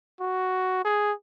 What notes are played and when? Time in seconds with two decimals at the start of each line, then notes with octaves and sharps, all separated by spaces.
0.20 F#4
0.85 G#4